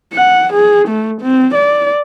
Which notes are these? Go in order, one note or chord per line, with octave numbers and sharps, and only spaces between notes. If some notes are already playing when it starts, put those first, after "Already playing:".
F#5
G#4
A3
C4
D5